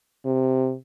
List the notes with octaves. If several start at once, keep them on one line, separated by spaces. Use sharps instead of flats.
C3